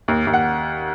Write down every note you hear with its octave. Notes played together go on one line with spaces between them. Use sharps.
D#2
D#2
F#5